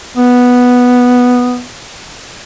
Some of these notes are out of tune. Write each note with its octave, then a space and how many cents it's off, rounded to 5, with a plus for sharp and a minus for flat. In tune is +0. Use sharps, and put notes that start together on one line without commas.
B3 +0